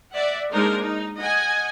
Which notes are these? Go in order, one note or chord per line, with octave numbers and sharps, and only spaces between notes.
D5 E5 F#5
G#3 A#3 D4 D#4 A#4 C5
D#4
D#5 F#5 G#5